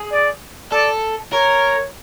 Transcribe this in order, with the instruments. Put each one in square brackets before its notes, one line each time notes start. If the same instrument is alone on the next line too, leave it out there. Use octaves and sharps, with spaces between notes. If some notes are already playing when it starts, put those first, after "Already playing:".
Already playing: [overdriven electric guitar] G#4
[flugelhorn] D5
[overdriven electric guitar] A4 [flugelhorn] D5
[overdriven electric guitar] A#4 [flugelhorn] C#5